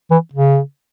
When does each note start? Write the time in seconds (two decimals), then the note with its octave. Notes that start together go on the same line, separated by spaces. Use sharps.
0.11 E3
0.34 C#3